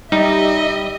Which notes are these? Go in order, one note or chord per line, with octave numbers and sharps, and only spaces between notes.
G3 D#4 D#5 E5